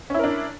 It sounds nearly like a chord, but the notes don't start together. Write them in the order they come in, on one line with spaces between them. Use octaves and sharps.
C#4 E4 A#4 D4